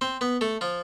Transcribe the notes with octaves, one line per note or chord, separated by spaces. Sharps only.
C4 C5
B3 B4
A3 A4
F3 F4